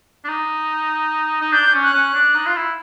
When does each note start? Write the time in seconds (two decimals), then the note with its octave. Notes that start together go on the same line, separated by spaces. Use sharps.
0.24 D4
0.28 D#4
1.41 D#4
1.52 D4 G6
1.67 D4
1.73 C#4
1.83 F#6
1.94 C#4
2.14 D4
2.34 D#4
2.46 F4
2.56 E4